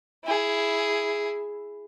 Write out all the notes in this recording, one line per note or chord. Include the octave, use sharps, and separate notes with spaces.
E4 G#4